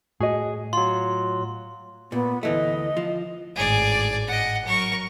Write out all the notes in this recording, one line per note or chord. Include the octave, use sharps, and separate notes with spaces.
A2 F#4 G#4 D#5
F#3 F4 C6
A#2 B3
D2 E3 A3 D#5
F3
G#1 A2 G#4 D5
D#5 F#5
F#3 A#4 C#6